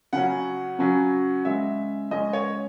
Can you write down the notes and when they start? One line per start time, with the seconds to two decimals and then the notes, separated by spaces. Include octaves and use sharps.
0.13 C#3 F#3 C#4 F#5
0.79 C#3 F#3 C#4
1.45 C#3 G#3 C#4 E5
2.11 C#3 G#3 C#4 D#5
2.33 C#5